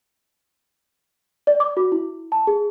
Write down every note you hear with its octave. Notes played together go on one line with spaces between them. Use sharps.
D5
D6
F#4
E4
A5
G#4